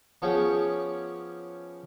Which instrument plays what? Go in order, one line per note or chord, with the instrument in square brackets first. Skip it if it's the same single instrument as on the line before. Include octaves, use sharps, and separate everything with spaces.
[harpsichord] F3 B3 C#4 G4 G#4